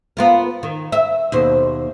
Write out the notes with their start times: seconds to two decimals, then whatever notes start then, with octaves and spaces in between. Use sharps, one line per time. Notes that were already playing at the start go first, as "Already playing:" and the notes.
0.17 B3 F4 A#4
0.63 D#3
0.92 E5
1.32 D#2 B2 C5